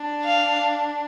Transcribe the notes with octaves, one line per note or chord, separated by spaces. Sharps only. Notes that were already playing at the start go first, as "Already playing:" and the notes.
Already playing: D4
F5